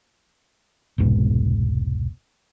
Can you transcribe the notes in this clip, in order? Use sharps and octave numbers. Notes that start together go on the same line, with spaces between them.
E1 C2 G#2 B2